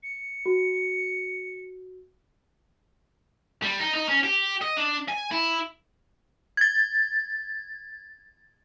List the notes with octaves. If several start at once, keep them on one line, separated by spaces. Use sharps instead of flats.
C#7
F#4
G3
D#4
D#4
C#4
G4
D#5
D4
G#5
E4
G#6 A6